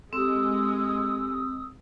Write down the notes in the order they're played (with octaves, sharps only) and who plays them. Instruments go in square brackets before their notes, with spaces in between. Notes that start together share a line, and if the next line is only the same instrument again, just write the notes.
[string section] G#3 [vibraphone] C4 [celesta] G4 A4 [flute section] D#6 E6